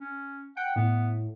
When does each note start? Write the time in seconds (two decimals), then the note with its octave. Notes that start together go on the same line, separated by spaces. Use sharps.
0.01 C#4
0.57 F#5 G5
0.76 A2 B3